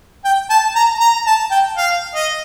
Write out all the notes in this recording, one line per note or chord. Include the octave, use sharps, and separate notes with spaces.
G5
A5
A#5
A#5
A5
G5
F5
D#5